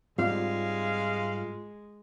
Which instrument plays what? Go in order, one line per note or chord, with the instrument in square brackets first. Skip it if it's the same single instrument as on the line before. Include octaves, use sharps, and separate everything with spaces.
[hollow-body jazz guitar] G#2 G3 C4 [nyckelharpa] G#3 [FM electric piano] F4 [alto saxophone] F5